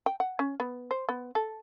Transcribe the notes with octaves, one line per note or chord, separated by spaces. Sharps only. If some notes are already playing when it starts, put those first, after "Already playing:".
G5
F#5
C#4
B3
C5
B3
A4